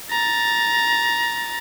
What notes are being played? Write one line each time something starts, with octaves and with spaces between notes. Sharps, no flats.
A#5 A6